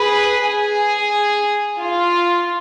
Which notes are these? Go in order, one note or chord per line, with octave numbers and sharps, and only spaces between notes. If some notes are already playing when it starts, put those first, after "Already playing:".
Already playing: G#4 B4
G#4
F4